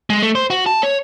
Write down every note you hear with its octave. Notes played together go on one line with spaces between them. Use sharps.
G#3
A3
C5
F#4
A5
C#5